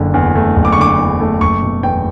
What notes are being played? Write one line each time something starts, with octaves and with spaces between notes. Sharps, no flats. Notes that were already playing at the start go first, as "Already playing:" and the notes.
Already playing: F#1 D3
E2
A3
F#1
D6
C#6
D3 D6
E2
A3
F#1 C#6
B2
E2 G5